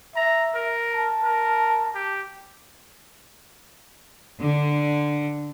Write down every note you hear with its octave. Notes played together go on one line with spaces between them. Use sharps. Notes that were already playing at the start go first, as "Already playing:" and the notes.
E5 A#5
A#4
A5
A#4
G4
D3